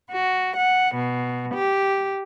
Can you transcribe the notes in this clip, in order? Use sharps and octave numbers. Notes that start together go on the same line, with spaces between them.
F#4
F#5
B2
G4